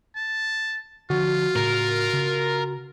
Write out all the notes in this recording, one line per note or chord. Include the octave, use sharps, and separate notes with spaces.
A5
D3 F3 F4 F#4
A2 C#3 A#4
C#3